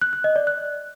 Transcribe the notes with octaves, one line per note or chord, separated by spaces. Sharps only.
F#6
F#6
D#5
D5
F#6